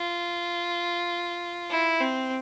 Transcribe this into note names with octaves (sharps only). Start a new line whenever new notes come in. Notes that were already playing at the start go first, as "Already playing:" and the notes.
Already playing: F4
E4
C4